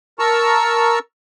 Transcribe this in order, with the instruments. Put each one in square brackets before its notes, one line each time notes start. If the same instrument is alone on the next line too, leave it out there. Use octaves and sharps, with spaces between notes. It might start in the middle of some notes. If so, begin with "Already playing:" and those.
[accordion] A#4 A5 A#5 C#6 E6